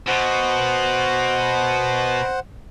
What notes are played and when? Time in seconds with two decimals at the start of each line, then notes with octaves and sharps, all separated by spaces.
0.08 B2 C5 F#5